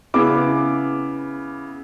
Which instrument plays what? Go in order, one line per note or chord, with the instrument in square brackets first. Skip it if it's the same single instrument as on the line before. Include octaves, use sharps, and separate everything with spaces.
[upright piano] C#3 B3 E4 D6